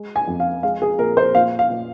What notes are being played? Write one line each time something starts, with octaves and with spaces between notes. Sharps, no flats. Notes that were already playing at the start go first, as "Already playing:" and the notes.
Already playing: G#3
G#5
F2
F5
G#3 F5
G#4
A#2 A#4
C5
A#2 F5
F5
A#2